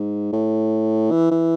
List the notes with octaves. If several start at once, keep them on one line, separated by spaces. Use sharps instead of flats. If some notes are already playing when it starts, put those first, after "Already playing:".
Already playing: G#2
A2
E3
E3